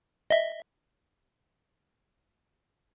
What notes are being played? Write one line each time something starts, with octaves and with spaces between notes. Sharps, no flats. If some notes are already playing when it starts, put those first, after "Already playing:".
D#5 E5